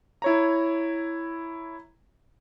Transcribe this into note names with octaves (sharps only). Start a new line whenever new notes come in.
E4 C#5 A#5